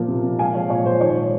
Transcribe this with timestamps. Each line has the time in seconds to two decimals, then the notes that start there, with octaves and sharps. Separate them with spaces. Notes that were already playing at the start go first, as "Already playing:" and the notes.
Already playing: A#2 F3 A#3
0.08 C3
0.23 C3
0.39 G#3 F5 G#5
0.54 F3 C#5 F5
0.70 A#2 C#5
0.84 A#2 C5
1.00 D#3 C#5
1.16 G#3